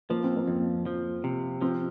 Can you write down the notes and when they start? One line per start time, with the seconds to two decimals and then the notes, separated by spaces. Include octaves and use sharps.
0.10 F3 A#3
0.24 C4
0.36 A#3
0.48 F2
0.86 F3
1.24 C3
1.61 F3 C4